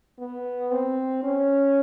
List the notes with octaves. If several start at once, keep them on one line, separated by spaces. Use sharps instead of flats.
B3
C4
C#4